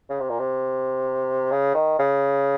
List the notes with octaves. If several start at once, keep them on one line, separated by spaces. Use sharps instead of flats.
C#3
C3
A#2
C3
C#3
D#3
C#3